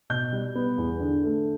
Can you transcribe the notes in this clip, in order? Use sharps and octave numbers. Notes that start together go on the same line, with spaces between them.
B2 G6
G3
B3
E2
D3
A3